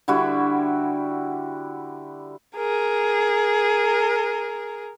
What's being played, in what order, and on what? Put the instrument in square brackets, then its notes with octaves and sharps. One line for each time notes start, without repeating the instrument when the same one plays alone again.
[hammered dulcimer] D3 G3 E4 F#4
[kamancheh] G#4 A#4